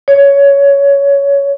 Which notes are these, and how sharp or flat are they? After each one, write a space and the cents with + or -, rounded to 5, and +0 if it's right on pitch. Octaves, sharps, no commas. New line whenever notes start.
C#5 +15